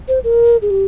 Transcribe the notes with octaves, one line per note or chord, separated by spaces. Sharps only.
C5
A#4
G#4
G4